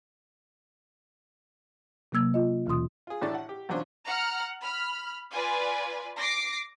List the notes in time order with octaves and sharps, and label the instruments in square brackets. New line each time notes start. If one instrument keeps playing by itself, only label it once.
[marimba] C3 F#3 A#3 E6 G#6
F4 D#5
D#2 B2 E3 F4 C6 D#6
[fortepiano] F4 G#4
A1 A2 D4 A4 D5 A5
F#5
G4
B1 E2 C#4 D4 F4 C5
[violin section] F#5 A#5 F6
B5 F6
F4 B4 D5 G#5
D6 A#6 C7 D7